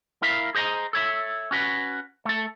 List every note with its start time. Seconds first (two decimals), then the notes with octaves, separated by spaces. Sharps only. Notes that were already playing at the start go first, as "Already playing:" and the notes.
0.22 E4 A#4 E5 F5
0.55 G#4 C5 D#5 F#5 A#5
0.93 A4 C#5 E5
1.51 C#4 F#4 B4
2.25 A3 A4